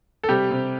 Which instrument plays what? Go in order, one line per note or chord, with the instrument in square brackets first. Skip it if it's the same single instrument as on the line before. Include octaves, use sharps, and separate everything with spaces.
[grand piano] A4
[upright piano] C3 [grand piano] G3 G4
[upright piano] C3